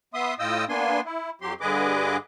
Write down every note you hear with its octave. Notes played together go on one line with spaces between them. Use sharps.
B3 E5 C6 D#6
A2 F4 D#5 G5 D#6 E6
A#3 B3 D4 G#5 C6
E4
F2 F#3 G4 C6
G2 D3 G#4 B4 D#5 D6